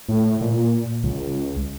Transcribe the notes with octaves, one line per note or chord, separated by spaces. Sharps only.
A2
A#2
C#2